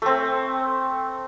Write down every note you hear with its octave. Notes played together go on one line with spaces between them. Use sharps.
A3 C4